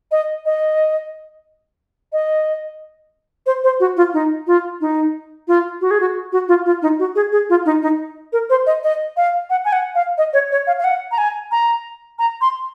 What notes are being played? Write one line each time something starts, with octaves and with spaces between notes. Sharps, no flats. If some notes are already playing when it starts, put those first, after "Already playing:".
D#5
D#5
D#5
C5
C5
F#4
F4
D#4
F4
D#4
F4
F#4
G#4
F#4
F#4
F4
F4
D#4
F#4
G#4
G#4
F4
D#4
D#4
A#4
C5
D#5
D#5
F5
F#5
G#5
F#5
F5
D#5
C#5
C#5
F5
F5
F#5
A#5
G#5
A#5
A#5
C6